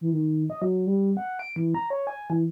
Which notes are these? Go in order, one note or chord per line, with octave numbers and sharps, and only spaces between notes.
E3
D#3
D#5
F#3
G3
F#5
D7
E3
A#5
C#5
G#5
E3